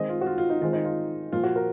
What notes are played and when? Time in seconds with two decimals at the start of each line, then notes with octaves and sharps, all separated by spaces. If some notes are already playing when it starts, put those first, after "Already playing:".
Already playing: D#3 G#3 C4 D#5
0.09 F4
0.21 F#4
0.26 F4
0.38 F4
0.50 D#4
0.61 D#3 G#3 C4 F4
0.73 D#4
0.85 F4
1.32 A#2 F3 A#3 F4
1.44 F#4
1.56 A#4